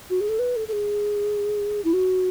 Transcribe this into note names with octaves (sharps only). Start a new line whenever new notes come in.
F#4
G#4
A4
B4
A4
A4
G#4
E4
F#4